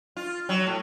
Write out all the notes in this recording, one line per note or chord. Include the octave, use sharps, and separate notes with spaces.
F4
F#3
A2